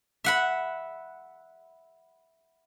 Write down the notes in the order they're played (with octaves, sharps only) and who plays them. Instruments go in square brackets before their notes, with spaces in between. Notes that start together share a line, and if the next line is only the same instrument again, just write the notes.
[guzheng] E5 F#5 B5